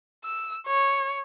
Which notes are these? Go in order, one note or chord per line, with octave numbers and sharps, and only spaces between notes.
E6
C#5